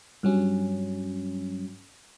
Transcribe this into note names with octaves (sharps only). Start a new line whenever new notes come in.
G2 F#3 C#4